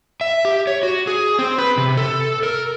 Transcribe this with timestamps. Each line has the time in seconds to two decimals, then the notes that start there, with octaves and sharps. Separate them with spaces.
0.21 E5
0.45 G4
0.67 C#5
0.83 F#4
1.07 G#4
1.39 C4
1.58 B4
1.78 C3
1.97 A4
2.43 A#4